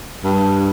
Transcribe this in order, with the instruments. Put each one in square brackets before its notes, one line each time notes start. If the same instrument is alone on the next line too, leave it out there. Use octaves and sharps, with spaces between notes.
[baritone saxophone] G2